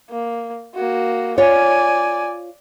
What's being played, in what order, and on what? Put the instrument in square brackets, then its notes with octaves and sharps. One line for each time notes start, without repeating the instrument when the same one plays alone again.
[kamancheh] A#3
A#3 F#4
[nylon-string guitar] F4 C#5 [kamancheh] D5 G#5